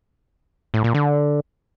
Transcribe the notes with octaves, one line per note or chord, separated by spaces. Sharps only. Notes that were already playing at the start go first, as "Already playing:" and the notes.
A2
A#2
D3